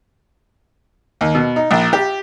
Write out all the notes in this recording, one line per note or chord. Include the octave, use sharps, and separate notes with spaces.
D#2
B2
D#4
A#1
G4